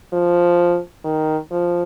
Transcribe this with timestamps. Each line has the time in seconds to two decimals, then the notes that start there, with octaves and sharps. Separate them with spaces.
0.13 F3
1.05 D#3
1.51 F3